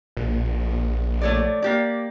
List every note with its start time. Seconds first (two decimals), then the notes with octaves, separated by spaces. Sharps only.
0.17 A#1
1.21 A3 C#5 D5
1.62 A#3 G4 D5